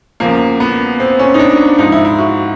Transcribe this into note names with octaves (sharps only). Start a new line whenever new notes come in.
E2 C#3 F3 A#3
B3
C4
C#4
D#4
D4
G#2 F3 D#4
E4
E4
F#4